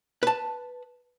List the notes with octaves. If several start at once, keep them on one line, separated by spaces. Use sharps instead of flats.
B4 A5